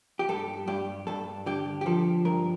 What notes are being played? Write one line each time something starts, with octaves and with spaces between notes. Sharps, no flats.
G4
G2 A4
G2 G4
G2 A4
D3 G4
G4
F3 A4
G2 A#4